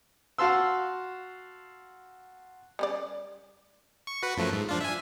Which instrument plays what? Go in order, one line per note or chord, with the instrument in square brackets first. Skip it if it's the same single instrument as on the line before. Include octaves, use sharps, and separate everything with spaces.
[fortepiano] F#4 F5 A5 C6 E6
[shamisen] G3 C#4 D5
[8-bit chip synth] C#6
F#4 B4
F#2 F3 A3
G#2
F3 D4 F4
E5 G#5